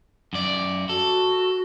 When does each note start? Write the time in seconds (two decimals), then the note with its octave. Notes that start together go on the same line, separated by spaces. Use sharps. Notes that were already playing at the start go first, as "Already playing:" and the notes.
0.33 F#2 D5
0.89 F#4 A4